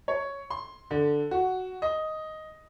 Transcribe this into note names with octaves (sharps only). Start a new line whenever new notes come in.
C#5
C6
D3
F#4
D#5